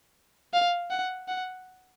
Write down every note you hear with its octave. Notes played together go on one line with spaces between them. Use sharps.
F5
F#5
F#5